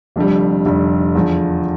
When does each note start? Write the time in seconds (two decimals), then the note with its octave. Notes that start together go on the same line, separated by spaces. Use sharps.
0.16 F1 F2 D3 G3
0.65 F1 F2 D3 G3
1.15 E2 D3 F3